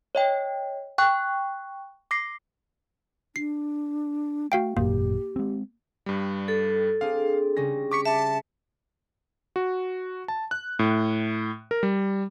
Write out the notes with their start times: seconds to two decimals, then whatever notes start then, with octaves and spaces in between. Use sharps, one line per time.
0.15 C#5 D#5 G5
0.98 G5 C#6 F#6
2.11 D6 A#6 C7
3.36 D4 C7
4.52 A3 F#4 F5 G5
4.77 G#1 F#2 A#2 A#3 G4
5.36 G#3 C4
6.06 G2 G3
6.48 A4
7.01 C4 D4 G#4 F5
7.57 C#3 G3 C#4 A#6
7.92 C#6 D6 B6 C#7
8.06 E5 A5
9.56 F#4
10.28 A5
10.51 F#6
10.79 A2
11.71 A#4
11.83 G3